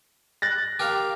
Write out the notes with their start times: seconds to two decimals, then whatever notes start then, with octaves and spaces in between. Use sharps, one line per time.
0.42 F#6 A6 A#6
0.79 G4 A#4 F5